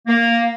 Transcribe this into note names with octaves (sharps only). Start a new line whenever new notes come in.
A#3